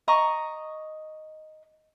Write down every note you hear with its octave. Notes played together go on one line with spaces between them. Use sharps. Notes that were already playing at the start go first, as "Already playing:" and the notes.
D#5 A#5 C#6